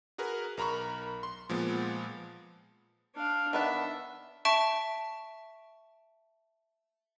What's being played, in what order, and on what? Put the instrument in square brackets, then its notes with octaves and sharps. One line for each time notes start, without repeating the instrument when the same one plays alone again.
[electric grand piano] F#4 G#4 A#4 B4
B1 A#4 A#5 B5 C#6
C6
A#2 F3 G#3 B3
[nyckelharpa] D4 F5
[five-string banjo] D#3 B3 D4 [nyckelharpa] E5
[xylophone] E5 A5 C#6 D7